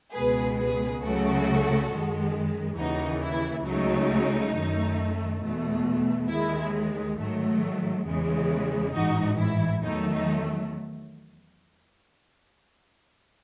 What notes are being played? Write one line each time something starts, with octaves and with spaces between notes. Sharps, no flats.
C#2 B2 G#3 G#4 B4
G#4 B4
C#2 C#3 F#3 A3 F#4 A4
F#2 D#3 G#3
D#2 C#3 E3 D#4 F#4
E4
C#2 C#3 F#3 A3 D#4
F#2 D#3 A3
E2 B2 A3
D#2 D#3 G#3 E4
G#2 D#3 F#3 A3
E2 C#3 E3 G#3
A1 G#2 E3 D#4 F#4
E4
E2 D#3 F#3 A3 D#4
D#4